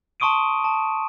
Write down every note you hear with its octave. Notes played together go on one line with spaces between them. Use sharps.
A5 C6 C#6 D#6 D7 D#7
A5